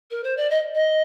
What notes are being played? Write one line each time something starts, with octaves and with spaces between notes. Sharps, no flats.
A#4
C5
D5
D#5
D#5